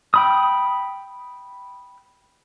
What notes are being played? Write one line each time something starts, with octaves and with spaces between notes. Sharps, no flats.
G5 B5 D#6